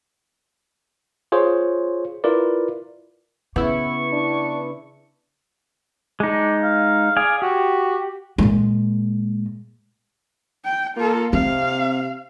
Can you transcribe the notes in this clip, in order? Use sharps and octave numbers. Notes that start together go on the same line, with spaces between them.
F4 G#4 C5 C#5
E4 F4 A#4 B4 D5
C#3 B3 E4 C#6
D4
G#3 D4 D#4
F5
G#4 D5 F5 G#5
F#4 G4
A#2 G#3
G5
A#3 F4 A4
C3 C4 F5